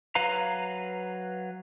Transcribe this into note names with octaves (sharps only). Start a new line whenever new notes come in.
F#3 B4 F5 A#5